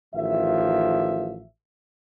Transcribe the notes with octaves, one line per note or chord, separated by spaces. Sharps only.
A1 D#3 F3 E5